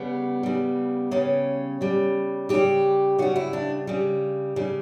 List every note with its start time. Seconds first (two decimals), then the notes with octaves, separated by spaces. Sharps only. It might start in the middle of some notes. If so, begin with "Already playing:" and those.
Already playing: C#3 G3 B3
0.43 C#3 G3
1.11 C#3 G3 C#4
1.81 C#3 G3
2.49 C#3 G3 G4
3.18 C#3 G3 F#4
3.36 E4
3.53 D4
3.87 C#3 G3
4.56 C#3 G3